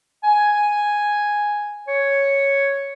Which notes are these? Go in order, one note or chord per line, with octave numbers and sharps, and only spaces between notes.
G#5
C#5